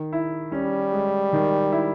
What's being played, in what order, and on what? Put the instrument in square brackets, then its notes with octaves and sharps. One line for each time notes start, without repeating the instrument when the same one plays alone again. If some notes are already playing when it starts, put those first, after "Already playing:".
Already playing: [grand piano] D#3
E4
[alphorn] G3 [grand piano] C#4
[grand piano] G#3
D#3
E4